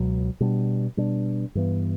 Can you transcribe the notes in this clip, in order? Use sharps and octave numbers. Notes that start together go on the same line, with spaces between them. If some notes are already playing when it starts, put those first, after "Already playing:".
Already playing: C#2 B2 F#3
B2 G3 D4
B2 G3 D4
G2 E3 B3